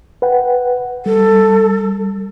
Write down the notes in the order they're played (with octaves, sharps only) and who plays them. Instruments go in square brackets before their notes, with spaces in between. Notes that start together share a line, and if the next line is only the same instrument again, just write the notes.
[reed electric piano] B4 F#5 G5
[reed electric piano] G3 [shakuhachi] A4